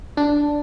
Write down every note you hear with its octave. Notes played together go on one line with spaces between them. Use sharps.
D4